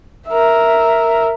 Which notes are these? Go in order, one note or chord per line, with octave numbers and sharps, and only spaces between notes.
A#4 E5